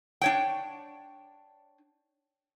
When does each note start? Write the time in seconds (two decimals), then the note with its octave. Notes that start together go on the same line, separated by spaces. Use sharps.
0.21 D4 C#5 G5